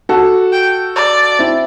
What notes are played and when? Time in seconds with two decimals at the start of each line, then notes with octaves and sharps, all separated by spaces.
0.09 F#4 A4
0.52 G5
0.96 D5
1.39 C4 E4